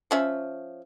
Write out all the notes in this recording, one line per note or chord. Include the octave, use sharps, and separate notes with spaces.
F3 C#4 E5